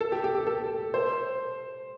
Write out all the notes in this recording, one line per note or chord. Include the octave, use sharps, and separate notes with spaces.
A4
G4
G4
G4
A4
C5